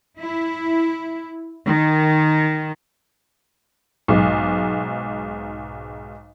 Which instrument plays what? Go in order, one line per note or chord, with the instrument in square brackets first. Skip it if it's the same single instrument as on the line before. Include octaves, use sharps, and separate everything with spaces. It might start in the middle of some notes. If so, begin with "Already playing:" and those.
[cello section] E4
D#3
[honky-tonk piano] B1 G#2